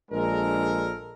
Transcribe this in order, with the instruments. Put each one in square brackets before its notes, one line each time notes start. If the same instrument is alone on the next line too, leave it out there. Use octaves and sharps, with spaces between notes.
[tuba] A#1 [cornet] G#3 [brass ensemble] D4 A4 A#4